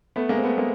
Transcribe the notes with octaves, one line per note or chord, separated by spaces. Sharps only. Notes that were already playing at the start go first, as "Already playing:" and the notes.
A3 B3
G#3 A#3
C4
A3 B3
G#3 A#3